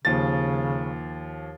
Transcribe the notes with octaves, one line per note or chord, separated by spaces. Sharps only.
D#2 C#3 F3 A6